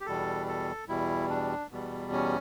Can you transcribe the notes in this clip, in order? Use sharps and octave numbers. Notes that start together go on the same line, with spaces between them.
G4
E2 B2 G3 A4
A4
E2 B2 G3 E4
D4
E2 B2 G3
C#4